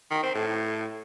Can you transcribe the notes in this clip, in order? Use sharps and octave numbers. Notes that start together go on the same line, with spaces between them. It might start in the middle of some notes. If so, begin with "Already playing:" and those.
D#3
C4
A2